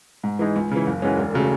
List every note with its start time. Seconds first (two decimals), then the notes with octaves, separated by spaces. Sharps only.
0.23 G#2
0.39 E3 G#3 D#4
0.56 C#2
0.71 C#3 E3
0.87 F#1
1.02 F#2 E3 G#3 C#4
1.17 E1
1.33 C#3 F#3 A3